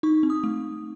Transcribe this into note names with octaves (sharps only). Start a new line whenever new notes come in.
D#4 C#6
C4
D#6
A3